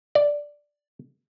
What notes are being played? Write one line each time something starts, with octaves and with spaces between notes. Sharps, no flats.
D5